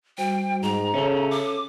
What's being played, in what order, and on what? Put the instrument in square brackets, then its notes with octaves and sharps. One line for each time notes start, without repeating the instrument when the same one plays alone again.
[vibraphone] G3 F#4 C5 [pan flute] G5
[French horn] G#2 [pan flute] A#5
[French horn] C#3 [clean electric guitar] C#4 A4 [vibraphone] E5
[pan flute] D6